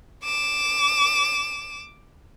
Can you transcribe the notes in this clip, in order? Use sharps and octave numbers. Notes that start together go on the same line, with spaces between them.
D6 E7